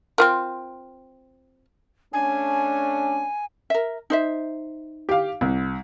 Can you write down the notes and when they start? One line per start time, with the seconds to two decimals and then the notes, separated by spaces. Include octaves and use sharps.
0.18 C4 F4 A#4
2.13 A3 C#4 D4 G#5
3.70 A#4 E5
4.10 D#4 C5 E5
5.09 G4 F5
5.41 C2